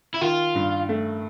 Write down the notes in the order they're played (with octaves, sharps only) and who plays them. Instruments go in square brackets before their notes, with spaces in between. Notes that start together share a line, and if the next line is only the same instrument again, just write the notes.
[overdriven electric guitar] E4
[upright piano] D#3 [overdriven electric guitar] F4
[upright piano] G2
A3